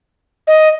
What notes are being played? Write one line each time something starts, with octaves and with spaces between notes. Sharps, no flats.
D#5